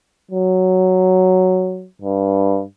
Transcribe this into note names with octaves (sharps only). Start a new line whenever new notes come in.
F#3
G2